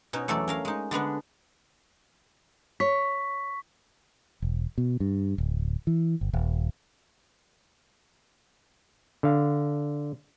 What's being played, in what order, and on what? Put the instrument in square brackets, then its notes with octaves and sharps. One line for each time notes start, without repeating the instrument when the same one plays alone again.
[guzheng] B2 C#4 D#4
E2 F#3 A3 C#4 A4 D5
C#4 A#4 F5
G#3 D#4
D3 G#3 B3 D4
[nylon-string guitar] C#5 [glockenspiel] C#6 B6
[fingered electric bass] E1
B2
G2
D1
E3
G1
D#1
[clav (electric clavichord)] D3 F5